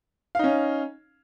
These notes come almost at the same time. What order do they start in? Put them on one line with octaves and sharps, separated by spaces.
F5 D#4 C#4